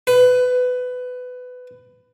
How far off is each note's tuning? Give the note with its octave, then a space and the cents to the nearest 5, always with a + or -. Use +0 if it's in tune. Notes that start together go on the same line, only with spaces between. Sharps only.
B4 +20